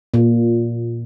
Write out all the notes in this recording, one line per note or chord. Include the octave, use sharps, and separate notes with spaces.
A#2